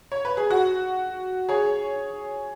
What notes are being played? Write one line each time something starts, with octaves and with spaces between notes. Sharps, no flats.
C#5
B4
G#4
F#4
G#4 C#5